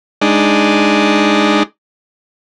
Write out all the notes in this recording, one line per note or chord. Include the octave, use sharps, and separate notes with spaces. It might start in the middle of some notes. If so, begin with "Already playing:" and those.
G#3 D4 D#4